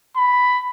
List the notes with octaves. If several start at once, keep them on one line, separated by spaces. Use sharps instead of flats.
B5